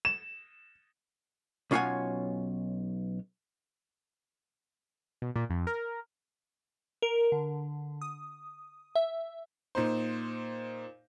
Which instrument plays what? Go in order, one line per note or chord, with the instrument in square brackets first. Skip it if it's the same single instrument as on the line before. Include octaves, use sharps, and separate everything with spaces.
[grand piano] E7
[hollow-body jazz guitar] B1 C#4 F4 C#5 F#5 G#5
[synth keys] B2
A#2
F2
A#4
A#4
D3
D#6
E5
[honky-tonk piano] A#2 D#4 C5